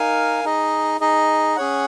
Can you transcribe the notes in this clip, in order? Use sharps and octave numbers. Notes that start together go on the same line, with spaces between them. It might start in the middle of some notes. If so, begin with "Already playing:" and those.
Already playing: D#4 A#4 F5 G#5
D#4 G#4 D#5
D#4 G#4 D#5
C#4 G#4 C#5 F#5